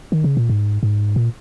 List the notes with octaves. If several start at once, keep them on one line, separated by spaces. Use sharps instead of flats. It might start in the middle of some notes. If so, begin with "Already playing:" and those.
D#3
C#3
A#2
G#2
G#2
A#2